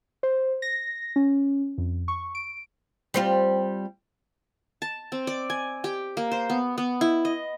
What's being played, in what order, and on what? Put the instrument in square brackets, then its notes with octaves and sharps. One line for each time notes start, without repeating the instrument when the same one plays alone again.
[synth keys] C5
A#6
C#4
F2
C#6
D7
[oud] G3 C4 F4
[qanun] A5
C4
D5
G#5
G4
A#3
C5
B3
B3
E4
D#5